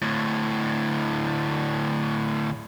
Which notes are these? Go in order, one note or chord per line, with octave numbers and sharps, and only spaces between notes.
D2 A2